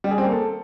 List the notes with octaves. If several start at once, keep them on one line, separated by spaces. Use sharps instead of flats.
G3
G#4
C4
A#3
A4